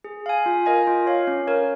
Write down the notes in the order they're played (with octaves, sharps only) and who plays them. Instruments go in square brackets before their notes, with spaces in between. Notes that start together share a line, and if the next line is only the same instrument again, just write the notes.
[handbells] G#4
F5 G#5
F4
A#4 D#5 G#5
F4
C#5 F5
C#4
A#4 C#5